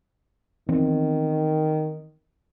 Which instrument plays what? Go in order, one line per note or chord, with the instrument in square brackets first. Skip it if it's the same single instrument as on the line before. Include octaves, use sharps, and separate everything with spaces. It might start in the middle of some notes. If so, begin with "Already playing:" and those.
[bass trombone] D#3 [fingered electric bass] E3 B3 C4